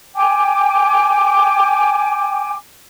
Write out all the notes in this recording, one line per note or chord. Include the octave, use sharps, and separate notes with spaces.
G5 G#5 D6